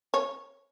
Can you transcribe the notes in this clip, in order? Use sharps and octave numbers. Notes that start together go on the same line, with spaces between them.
C#5